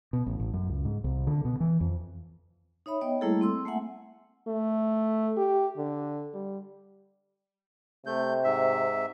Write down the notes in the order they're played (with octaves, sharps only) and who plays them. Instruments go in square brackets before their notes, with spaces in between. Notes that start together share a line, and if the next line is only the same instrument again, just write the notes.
[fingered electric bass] B2
A1
A1
F#2
C#2
G#2
C2
D3
B2
E3
F2
[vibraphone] D#4 C#5 E5 B5
B3 C#5 D#5 G5
G3 A3 A#3 E4 G#4 A4
C4 C6 E6
A3 A#3 E5 F#5 G#5
[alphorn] A3
G4
D3
G3
[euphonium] C3 [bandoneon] A3 G6
[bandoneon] G#2 E5